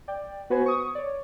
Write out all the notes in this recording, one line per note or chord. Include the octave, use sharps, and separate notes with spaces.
D5 G5
B3 F#4 B4 C5 F#5 G#5
C#6 D#6
C#5 D5